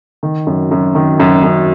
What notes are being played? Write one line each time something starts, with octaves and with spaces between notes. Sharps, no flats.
D#3
F#2
F#2
D#3
F#2
F#2